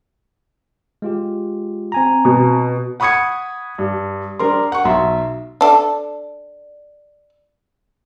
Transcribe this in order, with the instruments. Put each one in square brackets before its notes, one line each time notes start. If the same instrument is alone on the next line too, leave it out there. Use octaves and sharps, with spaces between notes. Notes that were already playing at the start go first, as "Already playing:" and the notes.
[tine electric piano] G#3 F4 G4
C4 G#5 A#5
[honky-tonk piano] B2
[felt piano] F#5 B5 C#6 D#6 G#6 C#7
G2
G3 D4 A#4 C6
F#5 C#6
B1 E5 A#5 C6
[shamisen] D4 A4